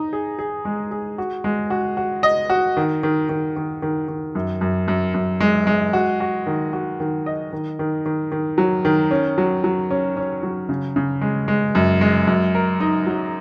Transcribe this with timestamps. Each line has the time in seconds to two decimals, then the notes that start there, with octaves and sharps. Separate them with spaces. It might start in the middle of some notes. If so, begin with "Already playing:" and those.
Already playing: D#4
0.13 G#4
0.39 G#4
0.65 G#3
0.91 G#4
1.18 F#4
1.44 G#3
1.70 F#4
1.97 F#4
2.23 D#5
2.50 F#4
2.77 D#3
3.03 D#3
3.29 D#3
3.56 D#3
3.82 D#3
4.08 D#3
4.35 F#2
4.61 F#2
4.88 F#2
5.14 F#2
5.40 G#3
5.67 G#3
5.93 F#4
6.20 F#4
6.47 D#3
6.73 F#4
7.00 D#3
7.26 D#5
7.53 D#3
7.79 D#3
8.06 D#3
8.32 D#3
8.58 F#3
8.85 D#3
9.11 C#4
9.38 F#3
9.64 F#3
9.91 C#4
10.17 C#4
10.43 F#3
10.69 C#3
10.96 C#3
11.21 G#3
11.48 G#3
11.75 F#2
12.01 G#3
12.27 F#2
12.55 A#4
12.80 D#4
13.06 F#3